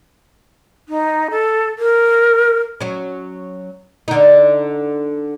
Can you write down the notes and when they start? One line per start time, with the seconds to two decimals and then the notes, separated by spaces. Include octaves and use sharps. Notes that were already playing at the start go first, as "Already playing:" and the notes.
0.89 D#4
1.31 A4
1.79 A#4
2.81 F#3 C#4
4.08 D3 D#4